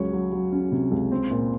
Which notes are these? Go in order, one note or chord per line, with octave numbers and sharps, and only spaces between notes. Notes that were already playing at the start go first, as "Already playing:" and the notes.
Already playing: C#2 F#3 C#4 C#5
F#3
F#3
C#4
C3
C#2
C4
A#2